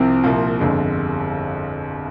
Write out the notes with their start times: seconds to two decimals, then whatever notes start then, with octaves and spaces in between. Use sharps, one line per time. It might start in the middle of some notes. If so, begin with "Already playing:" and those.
Already playing: C2 C3 F3 C4
0.24 C2 A#2 F3
0.59 G1 F2 D3 G#3